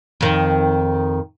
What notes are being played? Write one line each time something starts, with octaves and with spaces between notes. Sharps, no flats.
F2 D#3